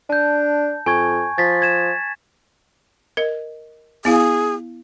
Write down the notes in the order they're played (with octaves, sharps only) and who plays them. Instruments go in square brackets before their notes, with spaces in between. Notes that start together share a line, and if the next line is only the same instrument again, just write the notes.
[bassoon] D4 [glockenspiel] A5 G6
[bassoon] F2 [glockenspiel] G#5 C#6 G#6
[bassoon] F3 [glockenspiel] A6 B6
[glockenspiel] G#6 E7
[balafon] A#4 D#5
[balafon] B3 E4 F5 [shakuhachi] G#4